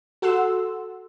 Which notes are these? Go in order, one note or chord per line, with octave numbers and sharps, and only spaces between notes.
F#4 A4 F#5 C6 E6